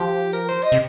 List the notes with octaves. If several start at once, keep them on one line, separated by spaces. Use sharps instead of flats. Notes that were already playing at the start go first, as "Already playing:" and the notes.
Already playing: F3 G4
A#4
C5
D#5
C3